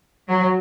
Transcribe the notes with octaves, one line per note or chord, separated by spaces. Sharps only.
F#3